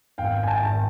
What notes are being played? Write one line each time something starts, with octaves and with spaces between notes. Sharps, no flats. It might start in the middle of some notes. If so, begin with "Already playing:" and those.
G#1 F5 G5
G#5
G5 A5
G#2 D#3